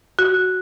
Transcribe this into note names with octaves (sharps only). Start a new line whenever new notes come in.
F#4